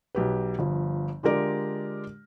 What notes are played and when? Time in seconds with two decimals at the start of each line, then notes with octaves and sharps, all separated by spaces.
0.15 B1 G4 B4
0.59 G1 F3
1.23 D3 G#3 F4 G4 A#4 D5